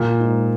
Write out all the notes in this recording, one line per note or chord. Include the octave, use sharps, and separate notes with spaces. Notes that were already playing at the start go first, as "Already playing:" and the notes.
Already playing: A#2
G#2